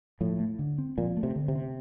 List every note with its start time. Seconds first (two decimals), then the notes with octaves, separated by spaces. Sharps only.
0.21 A2 F3
0.40 A3
0.59 D3
0.78 C4
0.98 A#2 F3
1.17 A3
1.23 C3
1.36 D3
1.48 C3
1.55 C4